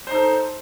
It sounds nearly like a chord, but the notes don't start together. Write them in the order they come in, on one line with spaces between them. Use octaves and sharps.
C5 D#4 A4